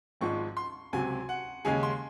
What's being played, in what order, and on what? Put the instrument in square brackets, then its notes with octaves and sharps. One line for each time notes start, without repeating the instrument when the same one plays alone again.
[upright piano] G#1 G#2 F3 G#3 [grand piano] C#6
[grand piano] C6
[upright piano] C#2 C3 F#3 [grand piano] G#5
[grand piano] F#5
[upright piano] D#2 C#3 G#3 C#4 G#4 [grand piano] G#5
[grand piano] C6